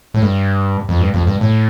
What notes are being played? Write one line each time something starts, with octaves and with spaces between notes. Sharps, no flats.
A2
G2
F2
G2
F2
G2
A2